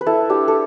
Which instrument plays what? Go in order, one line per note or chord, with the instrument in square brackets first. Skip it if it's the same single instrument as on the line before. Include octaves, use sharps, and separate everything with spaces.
[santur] B4
E4 A4
D4 G4
A4